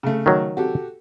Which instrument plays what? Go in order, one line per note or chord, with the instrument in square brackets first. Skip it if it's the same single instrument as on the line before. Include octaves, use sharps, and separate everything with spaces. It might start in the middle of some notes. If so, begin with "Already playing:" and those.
[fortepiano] C#3 A3
[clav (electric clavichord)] D#3 F#3
[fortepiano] F#4 G4 A4